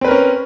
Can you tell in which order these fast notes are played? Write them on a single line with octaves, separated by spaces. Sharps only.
C4 B4 A#4 C#4